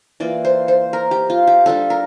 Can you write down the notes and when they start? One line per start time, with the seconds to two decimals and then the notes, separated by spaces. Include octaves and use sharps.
0.20 E3 A#3 F4 D5
0.45 C5
0.68 C5
0.93 A#4
1.11 G4
1.30 F4
1.47 G4
1.66 G3 D4 F4 A4
1.90 A#4